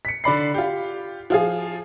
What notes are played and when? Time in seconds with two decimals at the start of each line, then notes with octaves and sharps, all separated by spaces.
0.05 B6 C#7
0.24 D3 D5 B5 C7
0.54 F4 G4
1.30 F3 F4 G#4